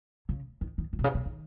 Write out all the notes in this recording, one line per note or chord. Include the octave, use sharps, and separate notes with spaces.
C#3
D#3
D#3
F#3
B2
C#3
B2
D#3